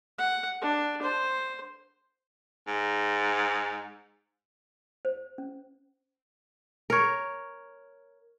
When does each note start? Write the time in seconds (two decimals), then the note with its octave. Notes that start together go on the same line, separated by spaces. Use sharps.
0.18 F#5
0.62 D4
1.02 C5
2.68 G#2
5.05 C5
5.38 C#4
6.90 A#4 C#5